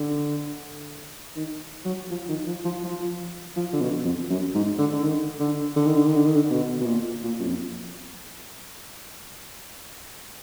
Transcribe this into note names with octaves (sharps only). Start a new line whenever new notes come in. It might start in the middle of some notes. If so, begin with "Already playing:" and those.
Already playing: D3
D#3
F#3
F3
D#3
F3
F3
F3
F3
D3
B2
F2
F#2
G#2
D3
D3
D#3
D3
D3
D#3
D3
D#3
D3
D#3
D3
B2
B2
A#2
A#2
F#2
F2